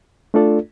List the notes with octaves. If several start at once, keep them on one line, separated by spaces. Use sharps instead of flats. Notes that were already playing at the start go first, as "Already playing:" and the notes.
A3 D4 F4 A4 D5